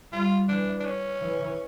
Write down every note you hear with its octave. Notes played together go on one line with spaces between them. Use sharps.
G3 F4
E3 D4
D4
C#4
E3